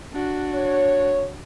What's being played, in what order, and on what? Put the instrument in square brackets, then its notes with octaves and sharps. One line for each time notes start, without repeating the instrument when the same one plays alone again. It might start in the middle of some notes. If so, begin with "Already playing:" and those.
[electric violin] D4 F#4
[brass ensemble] C#5